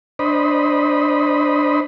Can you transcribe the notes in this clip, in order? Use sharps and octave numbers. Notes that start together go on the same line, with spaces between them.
D4 C5 D#5 B5